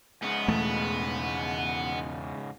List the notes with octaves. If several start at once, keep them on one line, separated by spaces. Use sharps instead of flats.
G#2 C#3 G#3 B3
E2 B2 E3 A3